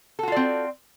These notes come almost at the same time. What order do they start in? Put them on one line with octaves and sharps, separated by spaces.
A4 F#4 F4 D5 C4